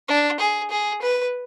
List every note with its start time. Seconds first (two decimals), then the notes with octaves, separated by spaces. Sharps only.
0.08 D4
0.40 G#4
0.70 G#4
1.01 B4